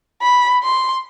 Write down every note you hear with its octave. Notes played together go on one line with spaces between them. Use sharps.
B5
C6